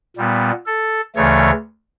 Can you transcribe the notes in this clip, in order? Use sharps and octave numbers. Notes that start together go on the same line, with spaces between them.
A#2 G3 B3
A4
D2 C#3 E3 A3 C#5